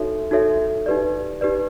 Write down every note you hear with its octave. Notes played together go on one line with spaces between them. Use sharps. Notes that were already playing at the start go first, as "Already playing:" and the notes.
Already playing: D#4 F#4 A4 C#5 E5
D#4 F#4 A4 C#5 E5
D#4 G4 B4 D5
D#4 G4 B4 D5